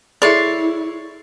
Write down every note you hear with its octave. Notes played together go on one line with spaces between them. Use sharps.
E4 G#4 A4 C#5 D5 E5 C6